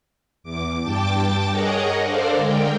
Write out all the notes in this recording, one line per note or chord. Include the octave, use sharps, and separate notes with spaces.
E2 D6
G2 G5 A5 D6 A6
G#4 A#4 C#5 D#5 F#5 A#5
D4 A4 A#4 C5 D5 F5
D3 G#3 A#4 G5